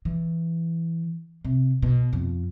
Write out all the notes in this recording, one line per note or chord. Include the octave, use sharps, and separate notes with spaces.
E3
C3
B2
F2